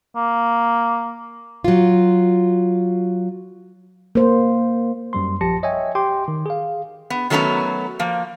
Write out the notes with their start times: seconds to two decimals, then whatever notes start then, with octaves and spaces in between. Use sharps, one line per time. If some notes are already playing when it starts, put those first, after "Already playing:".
0.16 A#3
1.64 F#3 F4
4.15 A#3 C5
5.13 F#2 G3 C6
5.41 A#1 F3 G4 A5 A#6 C#7
5.63 C#5 D#5 E5 G5 G#5
5.95 G4 G5 C6 D6
6.28 D#3
6.46 G#4 F5
7.10 B3
7.30 D#3 F#3 A3 B3 C#4 A#5
7.99 F3 A#3